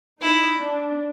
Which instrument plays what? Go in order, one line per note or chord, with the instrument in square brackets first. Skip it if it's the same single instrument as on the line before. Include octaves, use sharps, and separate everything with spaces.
[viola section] D#4 [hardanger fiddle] E4
[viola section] D4